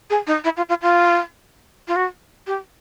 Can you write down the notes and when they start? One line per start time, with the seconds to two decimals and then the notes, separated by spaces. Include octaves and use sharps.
0.10 G#4
0.27 D#4
0.44 E4
0.57 F4
0.69 F4
0.82 F4
1.88 F4
1.96 F#4
2.47 G4